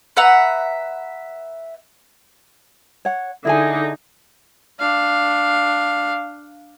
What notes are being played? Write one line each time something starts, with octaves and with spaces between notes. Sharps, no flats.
B4 E5 F#5 A#5
C#5 F#5
D3 D#4 E4 G#4 G#5
D4 F5